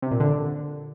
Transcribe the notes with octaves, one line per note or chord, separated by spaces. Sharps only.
C3
A#2
D3